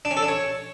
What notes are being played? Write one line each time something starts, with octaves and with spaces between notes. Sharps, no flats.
D4
C#4
A4
D4
C#5